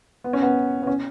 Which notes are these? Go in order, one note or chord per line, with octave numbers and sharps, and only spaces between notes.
B3
C#4
B3
B3
C#4